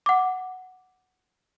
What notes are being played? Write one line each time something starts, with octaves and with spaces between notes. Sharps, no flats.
F#5 D6